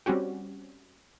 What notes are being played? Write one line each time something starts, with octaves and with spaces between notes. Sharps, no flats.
G3 C4 C#4 F#4 G4